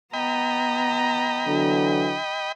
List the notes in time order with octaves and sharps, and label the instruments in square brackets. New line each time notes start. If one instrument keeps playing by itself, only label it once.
[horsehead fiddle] B3 A#5 [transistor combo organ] D#5 G5 B5
[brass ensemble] D3 E3 F#3